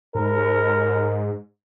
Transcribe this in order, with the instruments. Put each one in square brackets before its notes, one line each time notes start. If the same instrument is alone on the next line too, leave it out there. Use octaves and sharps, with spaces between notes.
[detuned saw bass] G#2 [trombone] A#4